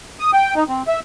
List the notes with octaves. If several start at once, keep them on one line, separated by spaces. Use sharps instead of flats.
D#6
G5
D#4
C4
E5